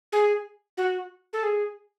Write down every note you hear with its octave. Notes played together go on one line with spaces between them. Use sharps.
G#4
F#4
A4
G#4